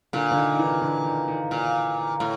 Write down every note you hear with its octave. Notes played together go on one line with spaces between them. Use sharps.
A#2 D3
D3
D#3
D#3
E3
D3
D#3
D#3
A#2
A2